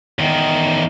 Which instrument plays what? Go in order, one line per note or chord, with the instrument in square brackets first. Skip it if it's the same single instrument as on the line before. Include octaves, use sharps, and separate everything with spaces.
[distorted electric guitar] E2 D#3